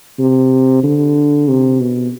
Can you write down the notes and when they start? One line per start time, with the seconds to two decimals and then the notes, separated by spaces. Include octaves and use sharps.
0.19 C3
0.83 D3
1.48 C3
1.80 B2